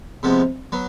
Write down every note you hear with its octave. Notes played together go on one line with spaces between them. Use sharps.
C3 F3 G#3 B3
F#3 B3